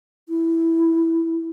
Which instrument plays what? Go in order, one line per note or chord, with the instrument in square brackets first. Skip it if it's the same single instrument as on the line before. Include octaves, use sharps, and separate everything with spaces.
[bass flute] E4